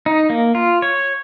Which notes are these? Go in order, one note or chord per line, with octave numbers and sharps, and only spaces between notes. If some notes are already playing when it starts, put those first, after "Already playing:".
D#4
A#3
F4
C#5